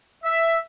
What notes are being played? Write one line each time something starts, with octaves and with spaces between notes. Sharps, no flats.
E5